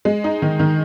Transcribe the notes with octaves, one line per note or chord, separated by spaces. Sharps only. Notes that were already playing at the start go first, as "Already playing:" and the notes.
G#3
D#4
D#3
D#3